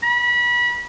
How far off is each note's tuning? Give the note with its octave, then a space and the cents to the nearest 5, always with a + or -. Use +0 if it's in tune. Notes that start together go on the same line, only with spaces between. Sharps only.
B5 -30